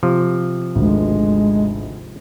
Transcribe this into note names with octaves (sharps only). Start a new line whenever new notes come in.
C3 F3
G#1 D2 G#3